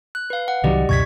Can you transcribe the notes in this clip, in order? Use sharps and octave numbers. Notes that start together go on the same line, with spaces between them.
F#6
B4 F5
F#5
C2 D#3 F#3 G4 D5 D#5
C#2 F#2 B2 C#6 G#6 B6